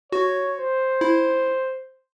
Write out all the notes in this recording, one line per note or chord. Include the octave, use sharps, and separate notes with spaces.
F#4 C#5
C5
E4